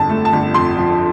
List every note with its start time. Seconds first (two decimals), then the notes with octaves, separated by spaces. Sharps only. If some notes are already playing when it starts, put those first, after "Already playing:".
Already playing: G1 F2 A5
0.09 A3
0.25 A5
0.33 G1
0.54 F2 C6
0.78 F3